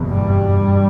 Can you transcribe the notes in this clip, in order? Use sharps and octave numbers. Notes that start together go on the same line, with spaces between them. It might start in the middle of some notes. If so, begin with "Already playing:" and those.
Already playing: F#1 E2 B2
G2 G3